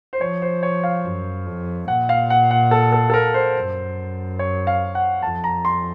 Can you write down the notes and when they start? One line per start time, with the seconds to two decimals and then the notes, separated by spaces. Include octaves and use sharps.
0.13 C5
0.21 F3 C#5
0.42 C5
0.63 C#5
0.84 F5
1.05 F#2
1.46 F2
1.88 A#2 F#5
2.09 F5
2.30 F#5
2.51 F#5
2.71 A4
2.93 A4
3.10 A4
3.14 A#4
3.34 C5
3.55 F#2
4.39 C#5
4.67 F5
4.95 F#5
5.22 F2 A5
5.44 A#5
5.65 C6